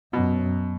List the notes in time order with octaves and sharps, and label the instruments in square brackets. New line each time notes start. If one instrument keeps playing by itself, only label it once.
[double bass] F#2 [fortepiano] B2